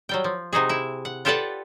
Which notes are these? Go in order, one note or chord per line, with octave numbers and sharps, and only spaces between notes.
F#3 G3 G5
F3
C3 D#4 F#4 G#4
E4 E5
F#5
F4 G4 A4 B4 D5 F#5